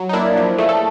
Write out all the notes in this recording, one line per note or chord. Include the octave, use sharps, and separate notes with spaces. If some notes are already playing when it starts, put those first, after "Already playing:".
Already playing: F#3
D#4
A#3 D4 E4
F3
A3 G#4
A4